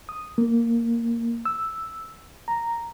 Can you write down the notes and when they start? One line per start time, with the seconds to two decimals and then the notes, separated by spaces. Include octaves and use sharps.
0.09 D#6
0.38 A#3
1.45 E6
2.48 A#5